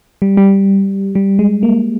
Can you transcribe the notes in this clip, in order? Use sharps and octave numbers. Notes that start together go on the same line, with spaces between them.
G3
G3
G3
G#3
A#3